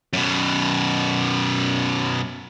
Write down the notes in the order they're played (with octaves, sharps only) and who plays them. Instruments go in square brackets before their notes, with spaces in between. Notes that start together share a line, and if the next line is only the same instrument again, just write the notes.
[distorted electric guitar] F#2 B2